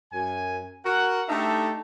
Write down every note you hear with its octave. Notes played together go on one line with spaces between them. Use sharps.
F#2 G#5
F#4 A#4 F#5
A3 D4 D#4 G4 A4 E5